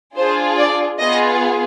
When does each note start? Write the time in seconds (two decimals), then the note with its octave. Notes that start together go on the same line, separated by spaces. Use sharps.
0.17 D4 F4 G#4 C5
0.58 D5
0.99 B3 F4 G#4 D#5